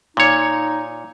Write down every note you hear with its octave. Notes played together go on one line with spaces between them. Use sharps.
A#2 D#4 C#5